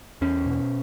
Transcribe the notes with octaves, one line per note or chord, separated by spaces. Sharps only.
E2 C#4
B2